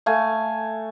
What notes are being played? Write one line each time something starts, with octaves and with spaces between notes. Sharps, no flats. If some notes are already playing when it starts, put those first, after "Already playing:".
A3 F5 G#5